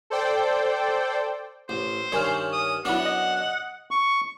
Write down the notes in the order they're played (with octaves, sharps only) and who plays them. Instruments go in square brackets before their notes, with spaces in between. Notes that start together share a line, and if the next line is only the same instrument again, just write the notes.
[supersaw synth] A4 C5 D5 G5
[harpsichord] A1 [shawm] C5
[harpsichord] G2 D#3 [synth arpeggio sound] C#5 G#5 F6
[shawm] D#6
[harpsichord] F#2 B3 D4 [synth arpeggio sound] E4 D6 [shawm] F#5
[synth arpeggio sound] D#5
[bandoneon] C#6